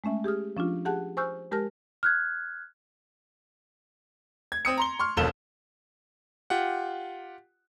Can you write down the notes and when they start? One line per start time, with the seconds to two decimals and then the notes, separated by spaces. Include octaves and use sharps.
0.04 G#3 A3 C#4 E5
0.24 G4 G#4 D#6 F6
0.57 F3 C#4 D4 F4
0.85 G4 G#4 F#5 A5 F#6
1.17 C5 G#5 C#6 E6 F6 G6
1.51 G#3 G4 A#4 A5 F6 A#6
2.03 F6 F#6 G#6
4.52 G#6
4.65 C4 D#6 C#7
4.77 A#5 C6 G7
4.99 C6 C#6 F6
5.17 E1 A#1 D#2 A4 E7 G7
6.50 F4 G4 F#5